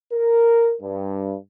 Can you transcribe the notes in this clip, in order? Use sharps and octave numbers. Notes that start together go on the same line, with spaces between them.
A#4
G2